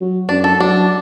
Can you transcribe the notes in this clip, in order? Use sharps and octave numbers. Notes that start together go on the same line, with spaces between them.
F#3
F#2 D4
A4
F#3 D4